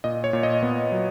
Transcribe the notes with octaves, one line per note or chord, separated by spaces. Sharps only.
A#2 D#5
C#5
A#2
D#5
B3
F#3